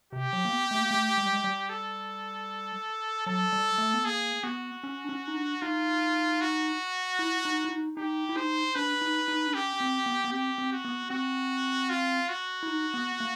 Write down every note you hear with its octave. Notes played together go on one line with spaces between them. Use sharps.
C3 G4
F#3
A#3
B3
A3
A#3
A3
G#3
G3
G#3
G3
A4
F#3 A4
G3
A3
B3
A#3 G#4
B3 F#4
C#4
D4
C#4
D#4
D4
D#4 F4
F#4
E4
D#4
E4
D#4
D#4 G4
E4
D#4 C5
D4 B4
D#4
D#4
D4
C#4 G4
C4
B3
B3
C4 G4
C4
F#4
B3
C4 F#4
F4
F#4
E4
D#4
B3
A#3